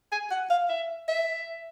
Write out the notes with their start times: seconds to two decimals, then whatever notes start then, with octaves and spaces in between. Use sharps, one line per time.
0.12 G#5
0.31 F#5
0.50 F5
0.69 E5
1.09 E5